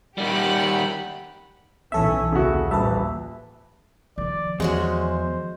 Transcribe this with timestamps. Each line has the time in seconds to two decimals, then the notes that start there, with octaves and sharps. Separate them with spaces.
0.18 D#3 G3 G4 F#5 B5
1.92 B1 E3 C#4 A4 E5
2.32 D#2 C#3 F#4
2.71 D#1 A1 B4 E5 A5
4.18 D#3 F3 D5
4.60 E2 G#3 C#4 F#4 C5